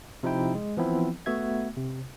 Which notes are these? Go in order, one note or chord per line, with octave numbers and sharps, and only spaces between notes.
C3 F3 D#4 E4 G5
G#3
E3 F3 B3 C4 E4
A3 B3 F#4 E5 G#6
C3